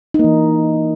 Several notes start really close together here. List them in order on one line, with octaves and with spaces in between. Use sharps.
D#4 A#3 E3